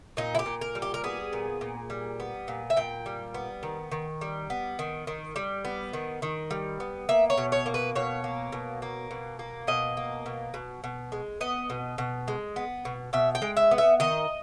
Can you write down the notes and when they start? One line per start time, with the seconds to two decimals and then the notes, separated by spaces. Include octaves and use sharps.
0.17 A#2 D#4
0.35 E4
0.39 G4
0.46 A#2
0.61 A#4
0.75 G3
0.82 G4
0.94 A#4
1.04 B3 G#4
1.33 A#2
1.61 A#2
1.90 G3
2.20 B3
2.48 A#2
2.70 E5
2.76 A#2 G5
3.06 G3
3.34 B3
3.63 D#3
3.92 D#3
4.21 G3
4.50 B3
4.79 D#3
5.07 D#3
5.36 G3
5.65 B3
5.93 D#3
6.22 D#3
6.51 G3
6.80 B3
7.09 A#3 E5
7.30 C#5
7.37 B2
7.52 C#5
7.66 A#3
7.74 B4
7.95 B2 C#5
8.24 A#3
8.52 B2
8.82 A#3
9.11 B2
9.39 A#3
9.67 B2 D#5
9.97 A#3
10.26 B2
10.54 B2
10.84 B2
11.12 G#3
11.41 B3 D#5
11.70 B2
11.98 B2
12.28 G#3
12.56 B3
12.85 B2
13.13 B2 E5
13.35 G5
13.42 G#3
13.57 E5
13.71 B3
13.78 E5
14.00 D#3 D#5